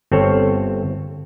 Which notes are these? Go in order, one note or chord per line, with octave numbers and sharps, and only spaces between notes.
G1 C4 A4 C#5